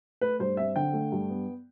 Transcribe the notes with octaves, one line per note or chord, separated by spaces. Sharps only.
A3 B4
G2 C5
C4 E5
D3 G5
A3
G2
B3